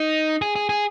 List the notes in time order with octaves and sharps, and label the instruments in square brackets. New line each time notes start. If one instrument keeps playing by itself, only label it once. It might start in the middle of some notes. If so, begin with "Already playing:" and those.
Already playing: [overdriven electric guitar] D#4
G#4
G#4
G#4